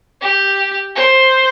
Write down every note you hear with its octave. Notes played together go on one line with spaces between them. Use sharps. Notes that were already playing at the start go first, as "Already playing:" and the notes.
G4
C5